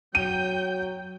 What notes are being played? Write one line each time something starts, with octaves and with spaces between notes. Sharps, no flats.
F#3 G5 G6 D#7